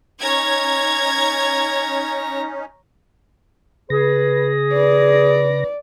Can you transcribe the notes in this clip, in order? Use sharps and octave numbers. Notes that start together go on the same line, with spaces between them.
C#4 D#4 C#5 A#5 G#6
C#3 G#4 B4 A#6
B4 D5